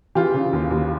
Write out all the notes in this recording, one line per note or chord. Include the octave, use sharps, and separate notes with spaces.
E3 F4 G4
C#3
D#2
D#2